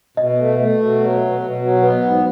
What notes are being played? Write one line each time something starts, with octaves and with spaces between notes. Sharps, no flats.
B2 D#5
A3
A3
B2
F#3
B2
B2
F#3
B3 B4
G#2